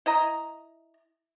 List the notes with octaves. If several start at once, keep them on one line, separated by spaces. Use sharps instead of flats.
E4 D#5 A#5